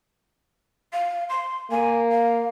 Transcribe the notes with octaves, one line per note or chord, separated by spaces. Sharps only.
F5
C6
A#3 G#5
F5